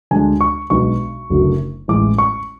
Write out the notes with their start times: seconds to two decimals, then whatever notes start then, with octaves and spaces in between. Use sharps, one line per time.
0.11 D2 D3 G#3 D4 G#5
0.41 C#6
0.70 B1 B2 G#3 D4 C#6
1.30 F#1 F#2 D3 F#3 A3
1.88 A1 A2 G#3 D6
2.18 C#6